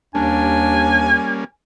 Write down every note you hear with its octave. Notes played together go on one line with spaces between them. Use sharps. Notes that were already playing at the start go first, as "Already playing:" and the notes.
D#2 G3 A#3 C#4 D4 G#5